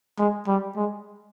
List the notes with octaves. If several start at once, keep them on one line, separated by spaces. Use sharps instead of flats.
G#3
G3
G#3